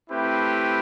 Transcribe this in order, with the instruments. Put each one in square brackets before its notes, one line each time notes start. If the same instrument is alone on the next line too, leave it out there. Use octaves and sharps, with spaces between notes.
[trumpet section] A3 C4 E4 G4 B4